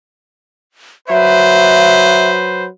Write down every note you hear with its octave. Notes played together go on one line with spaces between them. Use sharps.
F#3 B4 C5 E5